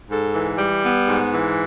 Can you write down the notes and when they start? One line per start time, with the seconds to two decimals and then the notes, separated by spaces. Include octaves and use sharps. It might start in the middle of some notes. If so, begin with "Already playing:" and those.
0.10 G#2 A4
0.34 E3
0.58 G3
0.83 B3
1.07 G#2
1.32 E3